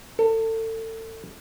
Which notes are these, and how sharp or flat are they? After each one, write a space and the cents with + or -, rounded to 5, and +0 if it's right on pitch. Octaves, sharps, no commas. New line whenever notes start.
A4 +30